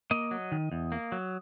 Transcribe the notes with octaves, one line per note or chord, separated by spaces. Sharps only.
A#3 D#5
F#3
D#3
E2
A#3
F#3